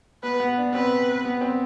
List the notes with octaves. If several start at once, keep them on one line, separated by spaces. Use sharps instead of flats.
B3 B4
B3
D4
C4 B4
B3
C4